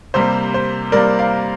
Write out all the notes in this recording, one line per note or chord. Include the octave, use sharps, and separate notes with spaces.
C3 G3 A#3 C5
C5
C3 G3 A#3 A#4 D5
D5 F5